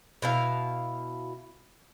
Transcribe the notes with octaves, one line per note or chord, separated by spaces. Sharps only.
B2 E4 F5